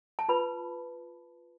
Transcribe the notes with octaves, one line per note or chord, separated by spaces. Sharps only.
A5
F4 B4 B5